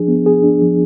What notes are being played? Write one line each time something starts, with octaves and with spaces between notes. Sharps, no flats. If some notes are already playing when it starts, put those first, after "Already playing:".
Already playing: F3 D4 G#4
B3
G#4
D4
F3